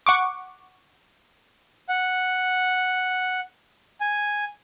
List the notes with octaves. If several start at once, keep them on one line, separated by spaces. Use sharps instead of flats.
F#5 C#6 D6
F#5
G#5